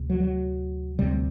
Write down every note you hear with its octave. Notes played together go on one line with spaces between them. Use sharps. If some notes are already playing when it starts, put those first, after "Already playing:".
Already playing: D2 C3
F#3
F#3
D2 C3 G3